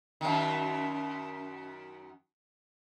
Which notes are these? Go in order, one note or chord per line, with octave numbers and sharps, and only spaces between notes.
F#2 D#3